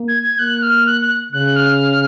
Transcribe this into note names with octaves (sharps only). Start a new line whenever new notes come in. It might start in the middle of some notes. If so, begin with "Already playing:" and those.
Already playing: A#3
G#6
G#6
A#3 F#6
F6
F#6
F#6
C#3 F#6
F6